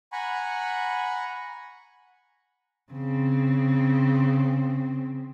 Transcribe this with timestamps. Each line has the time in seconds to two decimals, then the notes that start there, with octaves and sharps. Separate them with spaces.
0.12 F#5 G#5 A#5 B5 C#6
2.93 C#3 C4